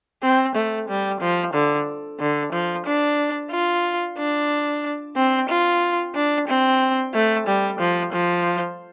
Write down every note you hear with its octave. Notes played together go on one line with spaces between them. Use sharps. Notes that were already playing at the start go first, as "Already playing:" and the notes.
C4
A3
G3
F3
D3
D3
F3
D4
F4
D4
C4
F4
D4
C4
A3
G3
F3
F3